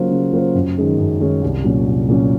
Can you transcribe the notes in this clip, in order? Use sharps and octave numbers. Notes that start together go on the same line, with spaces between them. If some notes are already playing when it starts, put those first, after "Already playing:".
Already playing: C#3 F#3 A#3 F4 C5
C#3
F#3 A#3 F4 C5
F#2
D#3 G#3 C#4
F#2
D#3 G#3 C#4
C2
A#2 F#3 C#4
C2
A#2 F#3 C#4